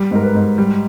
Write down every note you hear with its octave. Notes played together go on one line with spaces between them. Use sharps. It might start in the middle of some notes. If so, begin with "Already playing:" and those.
Already playing: G3
G#2 A#4
B4
G#2
G3